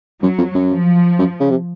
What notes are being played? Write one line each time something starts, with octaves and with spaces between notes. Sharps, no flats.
F#2 F#3
F2
F#2
F3
F#2
C#3
C3